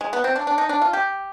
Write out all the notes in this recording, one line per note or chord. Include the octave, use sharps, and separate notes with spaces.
G#3
B3
C4
D4
D4
D#4
D4
F4
G4